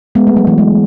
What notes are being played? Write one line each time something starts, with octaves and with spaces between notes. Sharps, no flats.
G#3 B3
A3
F#3
E3
G#3